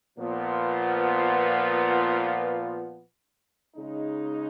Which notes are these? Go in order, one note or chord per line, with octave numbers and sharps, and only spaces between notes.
A#2 F3 B3 F4
C#3 G#3 D#4